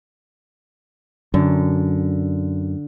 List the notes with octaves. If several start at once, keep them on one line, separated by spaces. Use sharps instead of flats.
F#2 D3